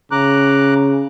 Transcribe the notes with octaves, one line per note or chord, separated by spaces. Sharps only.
C#3 A#5 D6 F#6